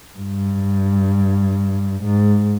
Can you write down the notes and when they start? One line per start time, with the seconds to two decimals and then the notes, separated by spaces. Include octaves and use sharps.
0.17 G2
2.03 G#2